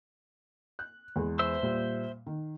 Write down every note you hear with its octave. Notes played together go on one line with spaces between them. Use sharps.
F#6
E2 G#3
C5 E5 E6
A#2 G3
D#3